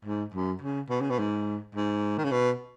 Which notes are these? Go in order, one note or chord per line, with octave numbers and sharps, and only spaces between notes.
G#2
F#2
C#3
B2
C#3
B2
G#2
G#2
D#3
C#3
B2